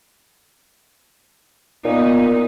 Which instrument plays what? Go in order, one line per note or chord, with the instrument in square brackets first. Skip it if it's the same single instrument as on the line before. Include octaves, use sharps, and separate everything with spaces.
[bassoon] A#2 [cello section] B3 D#4